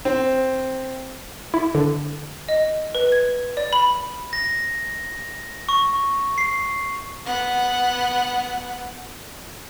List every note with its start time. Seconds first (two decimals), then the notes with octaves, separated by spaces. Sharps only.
0.05 C4
1.54 E4
1.75 D3
2.49 D#5
2.95 B4
3.12 G#6
3.57 D5
3.73 B5
4.33 A#6
5.69 C#6
6.38 C7
7.25 B3 F#5